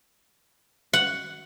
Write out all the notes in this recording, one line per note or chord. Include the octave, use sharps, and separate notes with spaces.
F#5